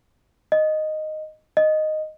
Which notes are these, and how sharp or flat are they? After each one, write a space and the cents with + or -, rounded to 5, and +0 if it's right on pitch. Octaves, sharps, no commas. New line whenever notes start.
D#5 -5
D#5 -5